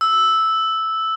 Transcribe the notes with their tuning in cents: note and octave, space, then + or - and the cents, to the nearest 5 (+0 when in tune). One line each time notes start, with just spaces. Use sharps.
E6 -5